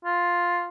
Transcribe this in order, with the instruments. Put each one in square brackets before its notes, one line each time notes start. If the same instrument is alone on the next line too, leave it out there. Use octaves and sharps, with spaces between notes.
[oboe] F4